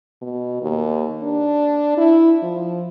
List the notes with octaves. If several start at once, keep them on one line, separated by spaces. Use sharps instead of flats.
B2
D#2
D4
E4
F3